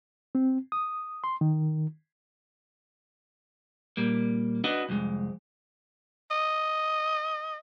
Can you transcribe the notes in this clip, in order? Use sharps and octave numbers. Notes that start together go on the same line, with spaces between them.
C4
D#6
C6
D#3
A#2 G3 A#3
D4 F#4 B4 D#5
C2 F2 G#3
D#5